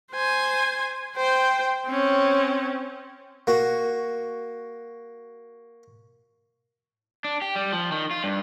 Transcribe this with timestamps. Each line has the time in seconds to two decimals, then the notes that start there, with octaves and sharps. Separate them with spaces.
0.12 C5 G#5
1.16 C5 G5
1.87 C4 C#4
3.47 A#3 F#4
7.24 D4
7.42 G4
7.55 G3
7.72 F3
7.92 D#3
8.11 F4
8.24 G2